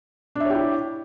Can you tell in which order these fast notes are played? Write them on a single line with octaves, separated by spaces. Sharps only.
D4 E5 C#5 G4 E4